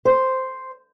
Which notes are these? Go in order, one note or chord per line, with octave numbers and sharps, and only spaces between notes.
C5